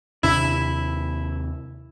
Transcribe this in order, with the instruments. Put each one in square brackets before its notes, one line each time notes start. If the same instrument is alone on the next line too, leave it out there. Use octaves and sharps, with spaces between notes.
[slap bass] D#2 C3 D4 [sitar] E4